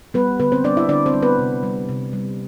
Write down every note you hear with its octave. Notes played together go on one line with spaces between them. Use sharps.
G3 B3 B4
D3 B3 B4
C4 C5
G3 D4 D5
E4 E5
D3 D4 D5
C4 C5
G3
B3 B4
C3
G3
C3
G3